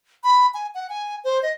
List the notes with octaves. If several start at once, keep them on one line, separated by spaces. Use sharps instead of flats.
B5
G#5
F#5
G#5
C5
D#5